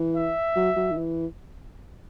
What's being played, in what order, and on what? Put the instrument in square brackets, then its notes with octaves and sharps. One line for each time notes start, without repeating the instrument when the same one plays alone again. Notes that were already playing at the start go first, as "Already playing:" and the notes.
Already playing: [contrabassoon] E3
[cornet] E5
[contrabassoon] F#3
F#3
D#3
E3